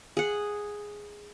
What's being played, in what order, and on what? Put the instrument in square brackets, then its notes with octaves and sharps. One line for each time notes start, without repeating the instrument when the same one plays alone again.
[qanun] G#4 F#5